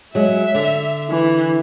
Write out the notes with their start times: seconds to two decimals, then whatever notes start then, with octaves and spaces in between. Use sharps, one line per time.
0.15 F#3 G#3 E5
0.55 D3
1.09 E3